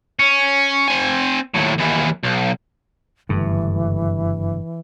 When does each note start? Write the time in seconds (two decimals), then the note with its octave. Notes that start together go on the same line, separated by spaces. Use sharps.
0.19 C#4
0.88 C4 G#5
1.54 D#2 A2
1.78 D#2 E3
2.23 B1
3.29 F#1 G2 D3 E3 A3